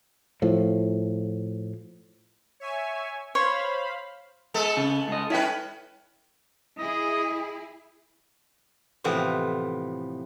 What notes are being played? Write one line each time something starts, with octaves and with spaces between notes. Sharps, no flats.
A2 F3
C#5 E5 G#5
C5 C#5 F5 B5 C6
G#3 B3 A4
C#3
C#2 D#5
C#4 E4 B4 E5 G5
E4 G#4 D#5
A2 C3 E3 F3 B3